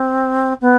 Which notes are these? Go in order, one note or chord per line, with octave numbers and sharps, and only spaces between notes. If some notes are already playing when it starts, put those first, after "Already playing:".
Already playing: C4
B3